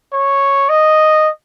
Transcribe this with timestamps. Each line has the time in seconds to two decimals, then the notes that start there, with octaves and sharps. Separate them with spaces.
0.13 C#5
0.69 D#5